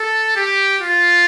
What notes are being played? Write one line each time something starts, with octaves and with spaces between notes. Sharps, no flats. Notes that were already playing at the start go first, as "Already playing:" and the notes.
Already playing: A4
G4
F4